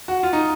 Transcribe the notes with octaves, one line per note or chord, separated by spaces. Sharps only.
F#4
F4
D#4